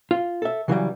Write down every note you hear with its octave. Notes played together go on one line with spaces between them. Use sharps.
F4
A4 E5
C#3 E3 F#3 G3